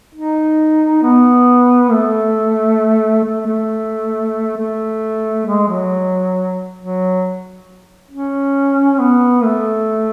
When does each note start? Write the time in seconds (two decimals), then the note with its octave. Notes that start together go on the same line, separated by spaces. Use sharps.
0.15 D#4
1.03 B3
1.92 A3
3.25 A3
3.47 A3
4.57 A3
5.46 G#3
5.68 F#3
6.79 F#3
8.11 C#4
8.99 B3
9.44 A3